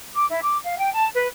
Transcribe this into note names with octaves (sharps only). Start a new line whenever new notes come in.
D6
E4
D6
F5
G5
A5
B4